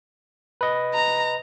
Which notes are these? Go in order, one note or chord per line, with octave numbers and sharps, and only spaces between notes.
B4 D#5
A#5